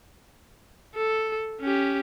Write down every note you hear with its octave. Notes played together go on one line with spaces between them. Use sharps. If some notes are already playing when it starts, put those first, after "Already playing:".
A4
C#4 G4